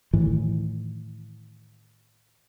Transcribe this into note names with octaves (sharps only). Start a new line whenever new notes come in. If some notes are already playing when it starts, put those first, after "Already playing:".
A2 D#3 E3